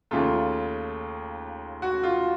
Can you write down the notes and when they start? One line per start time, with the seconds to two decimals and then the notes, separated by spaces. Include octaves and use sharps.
0.11 D#2 C#3 A3 F4
1.82 F#4
2.03 F4